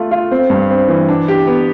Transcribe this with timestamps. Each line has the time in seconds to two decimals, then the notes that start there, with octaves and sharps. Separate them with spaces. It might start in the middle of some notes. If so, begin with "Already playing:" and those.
Already playing: A3 F4
0.11 F4
0.31 C4
0.50 G2
0.70 C4
0.88 E3
1.09 D4
1.28 G4
1.47 B3